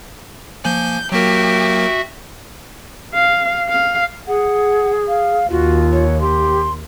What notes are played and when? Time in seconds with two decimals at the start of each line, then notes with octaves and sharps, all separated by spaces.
0.65 F3 A#3 G#5 G6
1.12 F#3 A#3 F#4 G4 A#4 E5
3.14 F5
3.69 F5
4.27 G#4 F#5
5.08 F5
5.50 D#2 F4 F#4
5.91 C#5
6.21 G4 C6